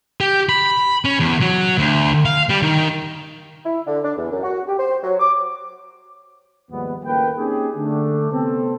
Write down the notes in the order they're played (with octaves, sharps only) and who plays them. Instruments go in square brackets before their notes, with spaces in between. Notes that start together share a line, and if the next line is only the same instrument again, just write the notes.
[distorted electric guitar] G4
B5
C#4
E2
F#3
D2
F5
G3
D#3
[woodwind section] E4
D3
D4
E2
F#2
F#4
G4
C5
F#3
D6
[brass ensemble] D#2 G#2 F3 G3 B3
D#2 A2 C#3 A#3 B4 G5
A#3 C4 C#4 D#4 G4 G#4
D3 A3 D4
C3 B3 C4 A4